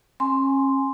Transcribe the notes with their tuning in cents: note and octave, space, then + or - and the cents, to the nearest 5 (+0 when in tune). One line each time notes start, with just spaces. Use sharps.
C#4 -35 G#5 +0 C6 +0